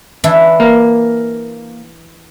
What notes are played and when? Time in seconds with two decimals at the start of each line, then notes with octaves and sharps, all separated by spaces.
0.24 E3 D4 E4
0.60 A#3